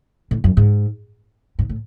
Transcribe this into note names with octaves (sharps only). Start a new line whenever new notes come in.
A2
F#2
G#2
G#2
A2